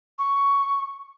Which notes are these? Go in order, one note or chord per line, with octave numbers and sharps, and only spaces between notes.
C#6